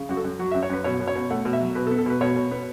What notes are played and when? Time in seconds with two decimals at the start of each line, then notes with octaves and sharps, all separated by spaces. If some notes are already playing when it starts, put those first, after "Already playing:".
Already playing: C#3
0.09 F#2 F#4
0.17 A4
0.25 F#2
0.39 F#3 F#4
0.51 F#2 E5
0.63 C#5
0.70 F#2 B4
0.84 B2 C#5
1.00 B2
1.08 C#5
1.15 B2
1.30 A3 F#5
1.45 B2
1.53 E5
1.60 F#3
1.75 B2 B4
1.87 A4
1.91 B3
1.98 A4
2.06 B2 B4
2.21 B2 C#5
2.36 B2
2.51 B3